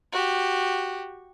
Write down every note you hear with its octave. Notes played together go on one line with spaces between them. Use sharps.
F#4 G4